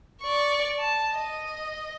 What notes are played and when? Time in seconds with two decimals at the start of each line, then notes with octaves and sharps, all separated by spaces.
0.22 D5 C#6
0.80 A5
1.14 D#5